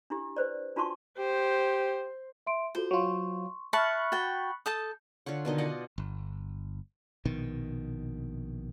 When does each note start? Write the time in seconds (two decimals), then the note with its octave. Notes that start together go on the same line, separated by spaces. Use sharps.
0.10 D4 E4 G4
0.36 B4 C5 D5
0.76 D4 F4 F#4 A5 C6 C#6
1.18 G4 C5
2.47 E5 C6 D7
2.75 F4 F#4 A4 C5
2.91 F#3 F4 C6 C#6
3.73 E5 A5 B5 C#6 F6 F#6
4.12 F#4 G5 A6
4.66 A4 A5 D#6 G6
5.26 D3 F4 C#5 F#5
5.45 B2 D3 D#3 D#5
5.58 F4 D5 D#5 F#5
5.98 G1
7.25 A#1 B2 D#3